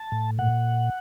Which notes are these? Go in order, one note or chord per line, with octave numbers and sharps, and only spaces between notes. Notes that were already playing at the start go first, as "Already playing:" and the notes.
Already playing: A5
A2
A#2 F#5